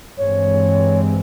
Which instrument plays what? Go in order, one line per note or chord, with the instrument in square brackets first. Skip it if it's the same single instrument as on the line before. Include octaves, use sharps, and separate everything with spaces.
[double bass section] G2 E3 G#3 C4 [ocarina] C#5